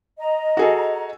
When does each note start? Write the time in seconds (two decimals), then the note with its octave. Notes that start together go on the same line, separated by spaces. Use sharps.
0.17 D#5 A#5
0.57 F#4 G#4 A4